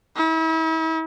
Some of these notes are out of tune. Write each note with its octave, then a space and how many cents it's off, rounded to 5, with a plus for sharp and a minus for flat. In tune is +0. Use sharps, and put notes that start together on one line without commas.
E4 -40